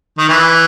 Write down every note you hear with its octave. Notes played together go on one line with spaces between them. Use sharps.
D#3
E3